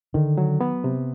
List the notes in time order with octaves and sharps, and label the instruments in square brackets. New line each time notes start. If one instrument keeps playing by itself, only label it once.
[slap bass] D3 [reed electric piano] D#3
[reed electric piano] F#3
B3
C3